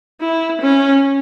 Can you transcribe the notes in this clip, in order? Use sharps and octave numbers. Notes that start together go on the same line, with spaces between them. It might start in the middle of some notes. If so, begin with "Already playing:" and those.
E4
C#4